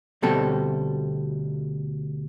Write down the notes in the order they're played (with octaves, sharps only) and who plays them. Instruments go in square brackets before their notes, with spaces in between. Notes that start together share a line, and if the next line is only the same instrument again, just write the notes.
[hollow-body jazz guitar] D2 B2 G3 C4 A4